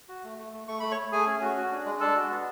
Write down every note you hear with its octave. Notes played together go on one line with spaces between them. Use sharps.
F#4
A3
A3
A3
A3 C#6
A3 B5
C#5 C#6
A3
A3 G#4 G#5
C#4
F#4
F#4
D4
G#3
D4 A4 A5
F#4
B3